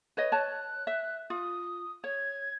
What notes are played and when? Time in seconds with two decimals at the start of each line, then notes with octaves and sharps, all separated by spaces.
0.17 B4 C#5 D#5
0.32 C#5 A5 F#6
0.87 E5
1.30 F4 D#6
2.04 C#5 G#6